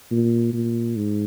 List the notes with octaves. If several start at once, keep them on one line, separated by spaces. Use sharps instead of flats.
A#2
A#2
G#2